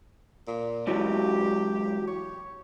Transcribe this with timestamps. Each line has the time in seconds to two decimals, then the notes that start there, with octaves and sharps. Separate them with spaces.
0.47 A#2
0.87 G#2 E3 F#3 G4
2.07 C#5